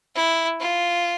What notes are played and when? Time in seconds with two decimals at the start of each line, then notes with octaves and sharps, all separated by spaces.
0.15 E4
0.60 F4